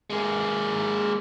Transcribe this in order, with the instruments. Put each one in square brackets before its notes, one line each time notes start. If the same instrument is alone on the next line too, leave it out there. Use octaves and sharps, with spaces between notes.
[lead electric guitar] G#3 A#3